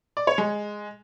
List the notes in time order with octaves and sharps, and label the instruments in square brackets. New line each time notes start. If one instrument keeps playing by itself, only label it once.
[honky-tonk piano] D5
C#5
G#3